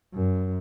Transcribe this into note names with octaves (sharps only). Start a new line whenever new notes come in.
F#2